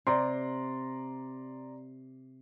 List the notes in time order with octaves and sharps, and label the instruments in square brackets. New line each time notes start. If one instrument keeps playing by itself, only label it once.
[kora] C3 [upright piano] D5 A#5 C6